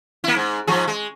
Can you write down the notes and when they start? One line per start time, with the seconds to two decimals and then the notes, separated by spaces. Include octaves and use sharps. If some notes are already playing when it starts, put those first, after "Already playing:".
0.24 A#3 E4
0.36 G#2
0.67 G#2 F3 G#4
0.88 G#3